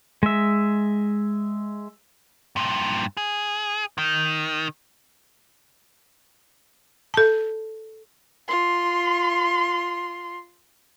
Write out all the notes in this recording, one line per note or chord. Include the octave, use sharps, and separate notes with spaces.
G#3 E5
G2 A#2
G#4
D#3
A4 A5
F4 C6